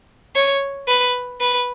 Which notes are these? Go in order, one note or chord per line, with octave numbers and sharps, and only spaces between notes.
C#5
B4
B4